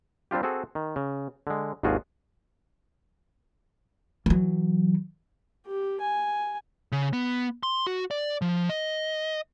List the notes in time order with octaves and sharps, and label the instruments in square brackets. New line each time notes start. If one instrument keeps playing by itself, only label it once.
[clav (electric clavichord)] G3 C4 D4 F4 G4
C4 F#4 G#4 A4
D#3
C#3
D3 G#3
G#1 D#2 D4 F4 F#4 G#4
[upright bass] E3 F#3
[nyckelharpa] G4
G#5
[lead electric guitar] C#3
B3
C6
F#4
D5
F3
D#5